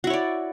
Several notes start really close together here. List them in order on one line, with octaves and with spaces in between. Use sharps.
F#4 E4 C#5 D5